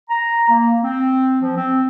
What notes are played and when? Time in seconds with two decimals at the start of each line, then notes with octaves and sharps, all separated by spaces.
0.10 A#5
0.48 A#3
0.82 C4
1.41 F3
1.56 C4